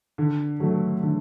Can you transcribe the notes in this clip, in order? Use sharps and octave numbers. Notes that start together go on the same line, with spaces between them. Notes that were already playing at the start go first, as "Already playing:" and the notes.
D3
F#3 A3
D3